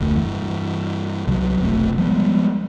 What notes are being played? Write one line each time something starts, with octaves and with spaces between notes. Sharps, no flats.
F1 D2 A3
G2 E3
C2 C3 F#3
F1 B1 C3 A3
F3 G3 G#3 B3